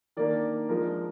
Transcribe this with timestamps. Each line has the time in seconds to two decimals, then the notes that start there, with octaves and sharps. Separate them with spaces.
0.17 D#3 A#3 D4 D5
0.69 F3 G#3 D4 A#4